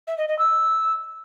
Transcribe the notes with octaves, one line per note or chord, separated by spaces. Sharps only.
E5
D#5
D#5
E6